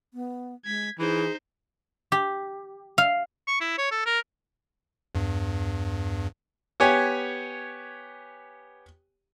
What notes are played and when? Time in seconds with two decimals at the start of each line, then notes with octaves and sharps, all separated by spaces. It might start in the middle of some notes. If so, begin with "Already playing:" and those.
0.14 B3
0.65 G#3 G#6 B6
0.99 E3 D#4 G#4 C5
2.12 G4
2.98 F5
3.47 C#6
3.61 E4
3.78 C#5
3.91 A4
4.06 A#4
5.15 E2 G2
6.80 B3 G4 C#5 G#5